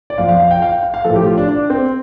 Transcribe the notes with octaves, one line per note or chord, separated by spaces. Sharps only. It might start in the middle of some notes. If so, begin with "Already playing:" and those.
D5
F2 F3 F5
F5
F5
G5
F5
G5
F5
F5
A2 F3 A4
G4
F4
D4
D4
C4